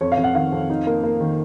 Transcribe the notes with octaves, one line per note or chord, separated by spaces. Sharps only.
F2 C#5
F5
F2
F#5
D#3 F5
F2
D#4
A#3
A#3
D#3